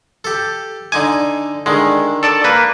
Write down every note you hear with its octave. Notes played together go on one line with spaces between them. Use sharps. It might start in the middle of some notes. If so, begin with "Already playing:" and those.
G4 A4
D3 D#4 G#5 D6
D3 D#3 G#3
A4 D5 A5
A#3 B4